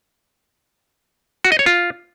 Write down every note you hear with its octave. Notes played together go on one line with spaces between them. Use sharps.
F#4
D#5
C#5
F4